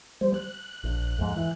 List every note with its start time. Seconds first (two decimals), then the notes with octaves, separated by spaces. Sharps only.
0.21 G3 C5
0.34 F#6
0.84 A#1
1.18 F2 G#2
1.36 E3